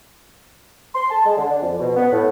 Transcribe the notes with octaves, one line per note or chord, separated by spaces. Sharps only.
C6
A5
G#3
D3
D4
F2
B2
B3
A2